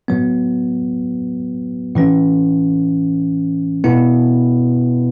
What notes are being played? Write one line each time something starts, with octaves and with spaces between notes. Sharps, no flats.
A2 F#3 B3
A2 E3 C#4
B2 B3 E4